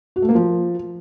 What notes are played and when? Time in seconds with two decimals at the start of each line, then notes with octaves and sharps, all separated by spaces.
0.16 F#4
0.22 A3
0.29 A#3
0.35 F3